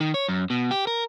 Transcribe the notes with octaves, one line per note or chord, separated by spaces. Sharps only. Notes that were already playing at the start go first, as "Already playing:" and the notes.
D#3
C#5
F#2
B2
G4
A#4